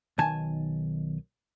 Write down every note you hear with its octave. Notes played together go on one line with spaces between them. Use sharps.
B1 D#3 G#5 A5